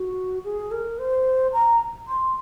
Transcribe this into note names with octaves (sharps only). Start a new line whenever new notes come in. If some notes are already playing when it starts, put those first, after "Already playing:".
Already playing: F#4
G#4
A#4
C5
A#5
C6